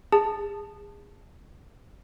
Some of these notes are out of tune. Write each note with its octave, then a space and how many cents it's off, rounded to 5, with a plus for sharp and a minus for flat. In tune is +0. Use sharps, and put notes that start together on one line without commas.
G#4 -25 A5 +0